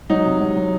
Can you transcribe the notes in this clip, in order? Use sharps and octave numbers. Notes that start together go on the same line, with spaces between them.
F#3 D#4
C3
F#3
F#3